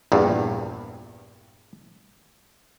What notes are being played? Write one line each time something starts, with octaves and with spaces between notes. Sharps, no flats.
A#1 E2 G2